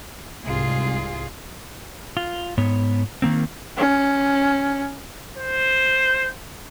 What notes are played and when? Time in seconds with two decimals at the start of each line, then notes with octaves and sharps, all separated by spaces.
0.44 C2 G#2 F4 G#4
2.17 F4
2.58 G#2 B3 C#5
3.22 D#3 A#3 C4
3.77 C#4
5.38 C5